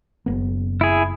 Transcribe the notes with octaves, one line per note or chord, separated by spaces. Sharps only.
F#1 B3
E4 G#4